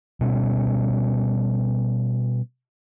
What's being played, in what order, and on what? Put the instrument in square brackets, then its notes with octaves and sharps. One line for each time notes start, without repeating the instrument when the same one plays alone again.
[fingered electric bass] B2 G3 C#4